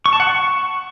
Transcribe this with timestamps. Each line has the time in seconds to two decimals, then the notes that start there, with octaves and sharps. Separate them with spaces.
0.06 C#6
0.13 A5
0.20 F#5
0.27 C#6